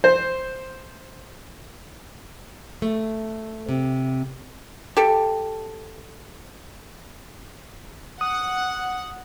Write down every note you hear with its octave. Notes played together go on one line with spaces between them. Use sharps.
C5
A3
C3
G4 A4
F#5 D#6